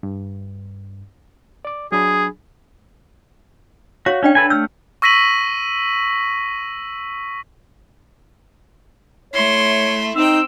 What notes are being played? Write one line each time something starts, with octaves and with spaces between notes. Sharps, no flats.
G2
D5 D6
F#3 D4 G#4 B5
F#4 C#5 F5
C#4 D4 D5 G5
A4 B4 G#5
A3 E6 F6 G6
C#6 E6 A#6 B6 D#7 F#7
A3 E4 C#5 C6
C4 D#4 G5 E6